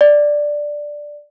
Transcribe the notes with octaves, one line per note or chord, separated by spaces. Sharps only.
D5